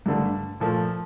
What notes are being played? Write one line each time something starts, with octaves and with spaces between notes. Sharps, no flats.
G2 D3 A3
A#2 F3 A3